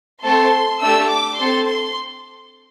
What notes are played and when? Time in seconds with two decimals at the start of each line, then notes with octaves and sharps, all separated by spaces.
0.24 A3 C4 A4 C6
0.81 A3 D4 G4 E6
1.10 D6
1.38 C4 A4 C6
1.66 C6